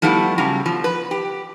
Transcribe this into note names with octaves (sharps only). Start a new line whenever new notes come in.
F3 G3 A3 B3 E4
C#3 F#3 G3 A#5
B2 F3
B4
G4